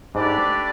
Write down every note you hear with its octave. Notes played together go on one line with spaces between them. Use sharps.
G#2 A3 D4 G4 B4 D5